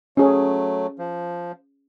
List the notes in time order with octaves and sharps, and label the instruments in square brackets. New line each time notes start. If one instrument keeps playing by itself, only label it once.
[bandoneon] F#3 A3 [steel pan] C#4 G#4 C#5
[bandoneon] F3